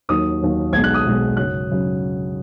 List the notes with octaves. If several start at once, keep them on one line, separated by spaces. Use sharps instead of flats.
D#2 D#3 F#3 D#6
D#2 D#3 F#3
B1 B2 G#3 G#6
F#6
D#6
B1 B2 G#3
F#2 C#3 F#3 F#6
C#3 F#3